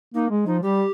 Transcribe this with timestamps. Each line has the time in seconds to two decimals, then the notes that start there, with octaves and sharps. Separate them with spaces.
0.14 A#3 D#4
0.30 G#3
0.46 F3 D#4
0.62 G3 G4